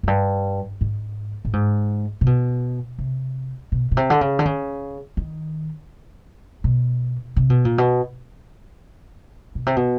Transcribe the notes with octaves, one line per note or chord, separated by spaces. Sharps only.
F#2
G2
G#2
A2
G#2
C3
B2
C3
B2
B2
C3
D3
C#3
D3
C#3
D#3
B2
C3
B2
A#2
B2
B2
C3
B2